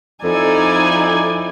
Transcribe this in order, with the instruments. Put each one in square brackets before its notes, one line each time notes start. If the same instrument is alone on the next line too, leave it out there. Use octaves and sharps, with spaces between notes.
[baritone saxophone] F2 [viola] D#4 G#5 [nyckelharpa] E4 D5 [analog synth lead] A4